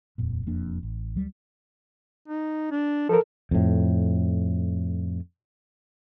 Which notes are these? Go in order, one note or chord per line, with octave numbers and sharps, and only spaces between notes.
D#1 F2 A#2
E1 F2 A#3 D4
A1
D2 F#3 G3
D#4
D4
F3 A4 A#4
F2 A2